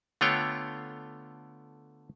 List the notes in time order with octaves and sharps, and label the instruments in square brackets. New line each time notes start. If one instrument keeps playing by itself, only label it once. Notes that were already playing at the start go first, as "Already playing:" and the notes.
[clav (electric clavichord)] D3 A3 B3 F4 C#5 G5